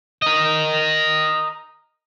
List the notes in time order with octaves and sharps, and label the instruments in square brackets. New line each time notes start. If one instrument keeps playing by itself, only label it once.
[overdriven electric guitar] A#4 D#5